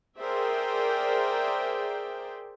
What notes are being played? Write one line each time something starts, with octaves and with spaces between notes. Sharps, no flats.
G#4 A#4 C5 D5 E5 G5